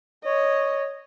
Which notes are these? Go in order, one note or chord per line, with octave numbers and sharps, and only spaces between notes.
C#5 D#5